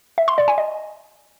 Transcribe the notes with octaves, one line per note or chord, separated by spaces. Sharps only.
E5
C6
D5
G#5
D#5